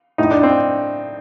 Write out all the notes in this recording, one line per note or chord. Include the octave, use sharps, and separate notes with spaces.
A2 D#4
D4
C4